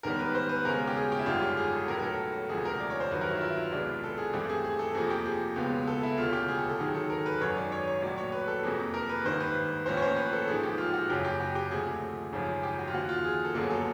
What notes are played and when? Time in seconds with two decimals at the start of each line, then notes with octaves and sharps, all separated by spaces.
0.03 A1 G#2 D#3 G3 B3 A#4
0.19 B4
0.35 C5
0.49 B4
0.65 C#2 B2 G#3 C#4 A#4
0.87 G4
0.96 G#4
1.12 G4
1.19 E4
1.26 G#1 F#2 D3 G3 F4
1.43 G4
1.57 G#4
1.73 A4
1.88 B1 A2 F#3 B3 A#4
1.99 A#4
2.03 A4
2.49 E1 D2 C3 F3 G#3 G#4
2.65 A#4
2.80 D5
2.90 C#5
3.00 C5
3.11 G2 D#3 F#3 B4
3.21 A#4
3.31 E4
3.37 F4
3.41 E4
3.56 F4
3.72 C2 B2 G#3 B3 D4
4.04 A4
4.18 G#4
4.33 G2 E3 A3 C4 G4
4.49 G#4
4.65 G#4
4.79 A4
4.95 F2 C3 F3 A#3 G#4
5.10 G4
5.26 G#4
5.56 C#2 B2 G#3 B3
5.87 A4
6.03 E4
6.18 E1 D2 C#3 F4
6.33 G4
6.48 G#4
6.59 A4
6.69 A4
6.80 G#2 D#3 F#3 G#4
6.95 A4
7.10 A#4
7.26 B4
7.41 G#1 F#2 D#3 F#3 C#5
7.57 D5
7.72 C#5
7.87 C#5
8.02 A#1 A2 F#3 D5
8.18 C#5
8.32 B4
8.48 A4
8.63 F2 C3 F3 A#3 G#4
8.94 A#4
9.09 B4
9.25 G#1 G2 D#3 C5
9.41 B4
9.86 A1 A2 F3 A#3 C#4 C5
9.97 C#5
10.02 C5
10.17 B4
10.33 A4
10.47 A1 G#2 F3 G#4
10.63 G4
10.78 F4
10.94 F#4
11.09 F#1 F#2 C#3 G4
11.25 G4
11.40 F#4
11.55 G4
11.70 D2 C3 F3 A3 G#4
11.86 G#4
12.33 G#1 F#2 C#3 F3
12.63 G4
12.79 F#4
12.88 F4
12.93 D#2 D3 F3 F#4
13.09 F4
13.24 G#4
13.44 A4
13.54 G1 F#2 D3 F#3 A#3 G#4
13.70 A4